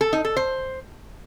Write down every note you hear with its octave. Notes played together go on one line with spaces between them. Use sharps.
A4
D#4
A4
C5